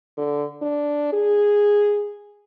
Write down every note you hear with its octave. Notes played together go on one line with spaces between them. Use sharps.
D3
D4
G#4